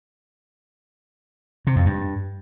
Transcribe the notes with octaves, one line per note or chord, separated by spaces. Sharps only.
C3
F2
G2